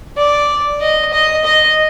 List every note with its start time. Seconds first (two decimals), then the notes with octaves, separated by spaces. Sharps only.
0.17 D5
0.81 D#5
1.13 D#5
1.45 D#5